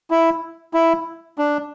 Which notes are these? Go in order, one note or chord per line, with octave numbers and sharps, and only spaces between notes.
E4
E4
D4